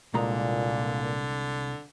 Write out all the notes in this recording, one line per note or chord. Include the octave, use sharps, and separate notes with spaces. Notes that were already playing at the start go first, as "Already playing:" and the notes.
C2 A#2 D3 G#3 A#5